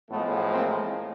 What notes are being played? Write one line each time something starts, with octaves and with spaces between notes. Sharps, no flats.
A1 A2 F3 G#3 A3 B3
A#3 C4